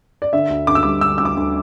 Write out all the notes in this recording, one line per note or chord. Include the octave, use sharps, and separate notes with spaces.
D5
D3 E5
D2
D2 D6
E6
G3 D6
D3 E6
D2 E6
D6
D2